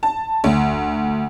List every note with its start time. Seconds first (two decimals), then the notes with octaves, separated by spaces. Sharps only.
0.03 A5
0.44 D2